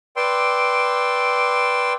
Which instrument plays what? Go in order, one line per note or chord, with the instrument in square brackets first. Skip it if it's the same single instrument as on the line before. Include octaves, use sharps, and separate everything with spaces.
[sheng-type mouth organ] B4 D5 G5 C6 E6